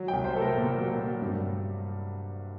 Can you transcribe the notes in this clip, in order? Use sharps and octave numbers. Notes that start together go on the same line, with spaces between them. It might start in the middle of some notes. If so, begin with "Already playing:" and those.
Already playing: F#3
G5
C2
C5
A3 A4
A#4
A#2
F#3
F#3
G2